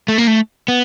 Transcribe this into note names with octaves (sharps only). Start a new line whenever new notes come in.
A3
A#3
A3
B3